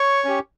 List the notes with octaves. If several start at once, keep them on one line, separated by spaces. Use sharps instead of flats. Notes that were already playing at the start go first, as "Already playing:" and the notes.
Already playing: C#5 C#6
C#4 G4